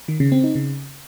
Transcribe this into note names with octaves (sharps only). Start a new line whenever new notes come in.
D#3
C#3
C4
D#4
C#3